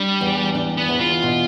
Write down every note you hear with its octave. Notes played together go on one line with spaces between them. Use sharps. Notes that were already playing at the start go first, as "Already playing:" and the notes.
Already playing: G3 D4
E2
D4
B3
E2
F4
B2